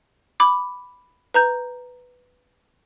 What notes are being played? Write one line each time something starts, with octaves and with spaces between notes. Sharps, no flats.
B5 D6
B4 A#5 G6